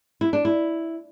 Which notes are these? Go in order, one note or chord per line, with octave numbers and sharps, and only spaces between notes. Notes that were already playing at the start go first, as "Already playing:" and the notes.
E4
D4
E4